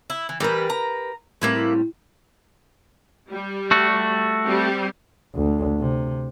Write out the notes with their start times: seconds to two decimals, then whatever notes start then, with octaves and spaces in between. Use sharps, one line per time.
0.10 E4
0.29 E3
0.40 E3 G3 G4 A#4 B4
0.70 A#5
1.42 A2 G3 A#3 C4 E4 B4
3.30 G3
3.71 A3 F#4
4.43 G3 C4 G4
5.34 D2
5.80 C3